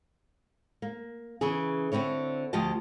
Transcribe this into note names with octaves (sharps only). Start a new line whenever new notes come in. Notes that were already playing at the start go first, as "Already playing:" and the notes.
A#3
C#3 E3 G#4
D3 C4 E4 C#5
D2 F3 G4 D#5 A5